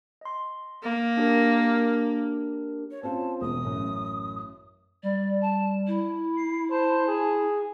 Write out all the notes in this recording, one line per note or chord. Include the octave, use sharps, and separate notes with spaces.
D#5 C6
A#3
D4 G4 A#4
C#5
C4 C#4 F4 A5
E1 D#6
A1 F#2
G3 D5
A5
E4
C7
C5 A5
G#4